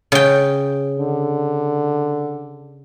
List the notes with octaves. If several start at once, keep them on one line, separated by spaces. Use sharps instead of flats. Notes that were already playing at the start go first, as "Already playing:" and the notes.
C#3 G5
D3